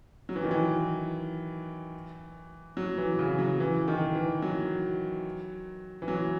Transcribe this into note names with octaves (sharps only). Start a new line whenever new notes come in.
F#3
E3
D#3
E3
F#3
E3
C#3
F#3
E3
D#3
E3
F#3
E3
F#3